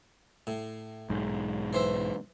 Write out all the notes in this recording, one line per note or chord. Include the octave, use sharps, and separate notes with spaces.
A2
B1 G#2
E3 C5 E5